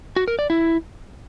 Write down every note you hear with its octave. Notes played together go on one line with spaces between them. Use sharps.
F#4
A#4
D5
E4